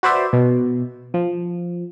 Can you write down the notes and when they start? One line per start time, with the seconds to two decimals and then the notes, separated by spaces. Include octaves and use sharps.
0.03 F#4 B4 C5 D5 E5
0.33 B2
1.14 F3